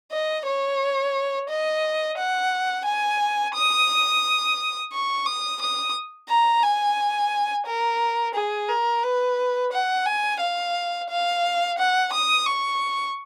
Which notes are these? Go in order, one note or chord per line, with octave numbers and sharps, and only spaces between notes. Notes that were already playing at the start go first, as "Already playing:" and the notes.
D#5
C#5
D#5
F#5
G#5
D#6
C#6
D#6
D#6
A#5
G#5
A#4
G#4
A#4
B4
F#5
G#5
F5
F5
F#5
D#6
C#6